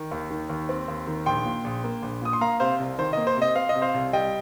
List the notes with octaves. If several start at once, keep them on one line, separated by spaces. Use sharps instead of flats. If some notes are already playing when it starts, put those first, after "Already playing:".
Already playing: D#3
D#2
D#3
D#2
C4
D#2
D#3
A#1 G5 C6
A#2
A#1
A#3
A#1
A#2 D#6
C6
A#3 F5 A#5
C3 C5 F5
C2
D#3 C5
A#3 D#5
C5
C3
D#5
C4 F5
D#5
C3
C5 F5
C2
G3 D#5 G5